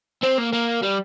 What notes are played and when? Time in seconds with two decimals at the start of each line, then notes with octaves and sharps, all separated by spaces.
0.23 C4
0.38 A#3
0.53 A#3
0.83 G3